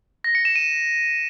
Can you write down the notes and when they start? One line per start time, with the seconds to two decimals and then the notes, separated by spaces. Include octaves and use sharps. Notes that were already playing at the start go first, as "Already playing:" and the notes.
0.24 A#6
0.35 C#7
0.45 E7
0.56 D#7